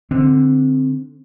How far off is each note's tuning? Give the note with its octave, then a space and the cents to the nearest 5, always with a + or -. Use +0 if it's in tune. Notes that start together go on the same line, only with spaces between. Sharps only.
D3 +0 C4 +0